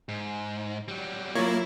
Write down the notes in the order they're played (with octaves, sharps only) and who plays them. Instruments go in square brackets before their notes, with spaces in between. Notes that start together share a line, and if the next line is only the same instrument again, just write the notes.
[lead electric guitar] G#2
F#3 G3
[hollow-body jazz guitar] F#3 F4 C#5 [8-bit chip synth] A#3 [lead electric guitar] E4